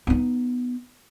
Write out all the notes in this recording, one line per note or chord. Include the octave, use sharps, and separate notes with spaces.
B3 D#4